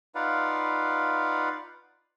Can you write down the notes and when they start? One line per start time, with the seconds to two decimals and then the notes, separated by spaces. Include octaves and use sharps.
0.15 D#4 F4 B4 D5 F5 F#5